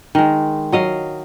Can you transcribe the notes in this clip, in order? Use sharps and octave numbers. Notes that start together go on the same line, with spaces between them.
D#3 G#3
F#3 D#5 F5